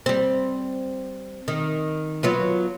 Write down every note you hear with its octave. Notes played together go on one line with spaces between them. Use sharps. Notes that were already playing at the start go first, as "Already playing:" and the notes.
G3 C4
D#3
F#3 B3 F4